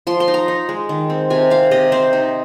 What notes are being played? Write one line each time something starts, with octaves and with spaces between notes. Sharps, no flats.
F3 C6
C6
D#4
A#5
D#4
G#3
D#3
C4
C3 G#5
C4 F5
C3 D#5
C4 C5
D#4